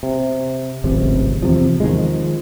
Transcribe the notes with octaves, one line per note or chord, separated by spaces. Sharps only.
C3
D1 G#1 C#2 C3
E2 C3 F3
D#3 F3 G#3